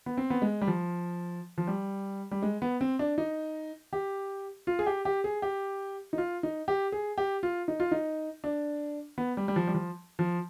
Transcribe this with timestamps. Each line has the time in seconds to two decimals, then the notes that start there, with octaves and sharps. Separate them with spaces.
0.06 B3
0.17 C4
0.30 B3
0.42 G#3
0.61 G3
0.67 F3
1.58 F3
1.67 G3
2.31 G3
2.42 G#3
2.62 B3
2.81 C4
2.99 D4
3.18 D#4
3.93 G4
4.67 F4
4.79 G#4
4.86 G4
5.05 G4
5.24 G#4
5.42 G4
6.13 D#4
6.18 F4
6.43 D#4
6.68 G4
6.92 G#4
7.18 G4
7.43 F4
7.68 D#4
7.80 F4
7.91 D#4
8.44 D4
9.18 B3
9.37 G3
9.48 G3
9.56 F3
9.67 G3
9.74 F3
10.19 F3